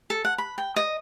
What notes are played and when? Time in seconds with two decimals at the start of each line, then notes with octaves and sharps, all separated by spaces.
0.10 A4
0.25 F#5
0.38 B5
0.58 G5
0.76 D#5